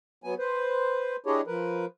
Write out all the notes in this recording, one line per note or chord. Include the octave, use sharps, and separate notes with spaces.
F#3 B3 G#5
B4 C5
D4 E4 G4 G#4 C#5 D#5
F3 A#4 B4